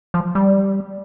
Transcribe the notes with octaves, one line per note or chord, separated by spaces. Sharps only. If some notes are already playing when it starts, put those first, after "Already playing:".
F3
G3